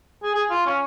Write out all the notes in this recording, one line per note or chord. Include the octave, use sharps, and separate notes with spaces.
G#4
G#4
F4
C#4